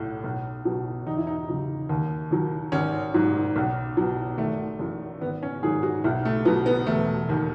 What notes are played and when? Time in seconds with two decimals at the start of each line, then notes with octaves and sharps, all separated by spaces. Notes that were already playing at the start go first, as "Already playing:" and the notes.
Already playing: B1 A2
0.24 B1
0.65 B2 F#3
1.07 E2 D#4
1.17 E4
1.27 D#4
1.48 C#3 F#3
1.89 D#2
2.31 D#3 F#3
2.72 G#1 C#4
3.14 G#2 F#3
3.56 B1
3.97 B2 F#3
4.38 G#1 A3
4.79 F#2 E3
5.21 G#1 B3
5.43 C#4
5.62 G#2 D#3 F#3 G#4
5.83 F#4
6.04 B1 E4
6.25 A3
6.45 B2 F#3 B3
6.66 B3
6.87 E1 A3
7.29 D#2 D#3